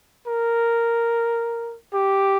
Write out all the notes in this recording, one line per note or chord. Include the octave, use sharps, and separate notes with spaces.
A#4
G4